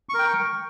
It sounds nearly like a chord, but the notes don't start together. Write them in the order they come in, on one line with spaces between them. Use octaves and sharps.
C#6 A#4 G5